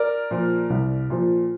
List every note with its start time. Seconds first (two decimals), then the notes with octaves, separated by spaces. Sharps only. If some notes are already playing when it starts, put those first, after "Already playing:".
Already playing: A#4 D5
0.31 A#2 F3
0.70 C2
1.10 A#2 F3